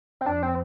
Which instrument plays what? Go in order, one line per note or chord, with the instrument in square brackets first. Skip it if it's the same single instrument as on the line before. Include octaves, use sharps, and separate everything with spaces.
[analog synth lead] C4
[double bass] F2 [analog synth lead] D4
[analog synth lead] C4